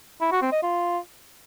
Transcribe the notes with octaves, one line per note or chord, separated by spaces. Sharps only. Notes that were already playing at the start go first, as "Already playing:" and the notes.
E4
F#4
C4
D#5
F4